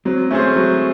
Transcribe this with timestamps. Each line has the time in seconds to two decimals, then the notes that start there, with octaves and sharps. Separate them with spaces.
0.05 F#3 G#3 C4
0.31 A3 C#4 G#4 C5
0.56 F#3